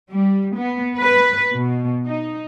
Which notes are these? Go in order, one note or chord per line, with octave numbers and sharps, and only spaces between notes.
G3
B3
B4
B2
D#4